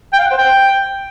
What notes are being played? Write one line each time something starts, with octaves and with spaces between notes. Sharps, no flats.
G5
F5
F#5
C5
G5